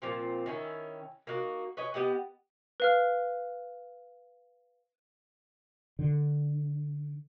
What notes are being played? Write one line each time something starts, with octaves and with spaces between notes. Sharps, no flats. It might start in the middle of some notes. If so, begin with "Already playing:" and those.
A#2 F3 C4
D#3 C#4 E4
A#3 D#4 F#4
B4 C#5 D#5 G#5
B3 G4 D#5 F#5
B4 F5 F6
D3